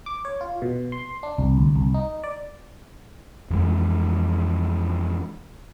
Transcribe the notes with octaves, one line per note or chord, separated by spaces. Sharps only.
D6
C#5
F4
B2
C6
D4
C2
D2
C2
D#4
D5
F2 E3 G#3